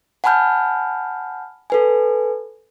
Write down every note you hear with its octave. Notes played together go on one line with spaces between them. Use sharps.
F#5 G#5 A5 B5 F6 G6
A4 B4 G#5